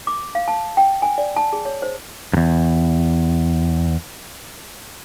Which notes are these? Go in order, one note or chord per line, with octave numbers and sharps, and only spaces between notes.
D6
F5
A5
G5
G#5
D5
A5
G#4
C#5
C5
E2 G2